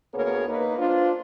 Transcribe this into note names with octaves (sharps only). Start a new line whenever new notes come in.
D2 A#3 B3 G#4 A#4 C#5
A#3 D#4 B4
D4 F4 C5